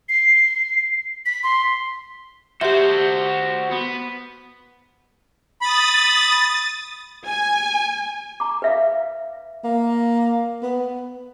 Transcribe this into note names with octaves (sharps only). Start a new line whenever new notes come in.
C7
B6
C6
F#4 G4 C5 E5
B3
B5 D#6 A6
G#5
A#5 D6
B4 E5 F5
A#3
B3